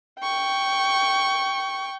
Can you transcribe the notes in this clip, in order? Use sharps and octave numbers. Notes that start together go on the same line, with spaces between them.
G5 C#6